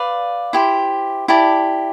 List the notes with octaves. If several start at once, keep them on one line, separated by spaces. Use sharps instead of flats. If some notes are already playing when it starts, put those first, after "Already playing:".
Already playing: B4 D5 F5
E4 G4 C5
E4 G4 D5 A5